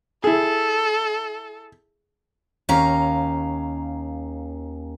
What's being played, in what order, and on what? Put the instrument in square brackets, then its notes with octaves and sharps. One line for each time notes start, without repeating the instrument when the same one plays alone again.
[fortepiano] E4 G#4 [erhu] A4
[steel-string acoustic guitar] D#2 C#4 F5 A#5